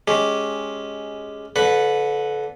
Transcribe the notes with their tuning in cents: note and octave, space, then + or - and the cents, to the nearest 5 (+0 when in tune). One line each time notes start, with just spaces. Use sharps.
G#3 +5 C#4 +0 G4 +0
D3 -25 B4 +0 F#5 +0